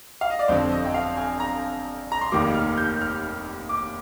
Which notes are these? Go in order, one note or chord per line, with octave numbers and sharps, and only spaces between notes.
F5
D#5
D5
G1 F2 D3 F3 C4 C5
D#5
G5
F5
G#5
A#5
A#5
C6
F1 D#2 D#3 G3 A#3 D6
F6
G6
F6
D6